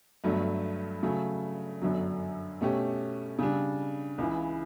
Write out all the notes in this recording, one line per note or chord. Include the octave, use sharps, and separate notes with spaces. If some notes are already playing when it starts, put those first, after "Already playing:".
G1 G2 F#3 A3
C#3 F#3 A3
G1 F#2 D3 F#3
B2 A3 C#4 G4
C#3 G3 D4
C#2 C#3 E3